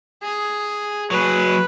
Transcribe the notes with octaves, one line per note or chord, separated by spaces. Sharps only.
G#4
F#3 G#4 B4